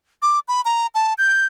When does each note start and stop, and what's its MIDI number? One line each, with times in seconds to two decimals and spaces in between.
0.22 0.39 86
0.48 0.61 83
0.65 0.87 82
0.95 1.13 81
1.18 1.46 91